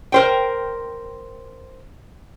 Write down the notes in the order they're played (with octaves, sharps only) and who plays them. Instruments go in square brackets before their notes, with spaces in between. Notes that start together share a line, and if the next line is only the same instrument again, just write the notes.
[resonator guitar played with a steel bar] A#4 C5 G5